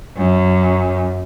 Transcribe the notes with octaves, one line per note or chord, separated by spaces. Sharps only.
F#2